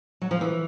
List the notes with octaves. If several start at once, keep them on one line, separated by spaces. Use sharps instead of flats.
F#3
F3
E3